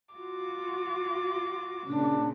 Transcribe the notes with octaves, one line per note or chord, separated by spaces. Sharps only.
F4 F#4 D6
A#2 C#3 D4